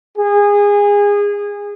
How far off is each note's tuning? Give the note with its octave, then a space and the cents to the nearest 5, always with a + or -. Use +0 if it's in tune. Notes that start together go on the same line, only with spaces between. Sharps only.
G#4 -25